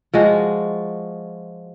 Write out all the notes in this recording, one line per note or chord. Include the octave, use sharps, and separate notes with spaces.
F3 G#3 F#4